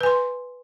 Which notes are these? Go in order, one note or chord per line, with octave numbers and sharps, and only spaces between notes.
B4 G#5 C6